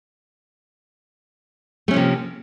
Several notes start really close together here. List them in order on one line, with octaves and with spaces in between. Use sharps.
A3 C#4 F3 C3 A#3